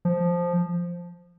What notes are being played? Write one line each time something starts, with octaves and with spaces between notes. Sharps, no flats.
F3